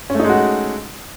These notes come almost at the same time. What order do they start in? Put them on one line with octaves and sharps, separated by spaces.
C#4 A3 D#4 G#3 F#4